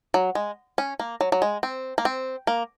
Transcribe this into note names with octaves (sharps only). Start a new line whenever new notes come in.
F#3
G#3
C#4
A#3
F#3
F#3
G#3
C4
A#3
C4
A#3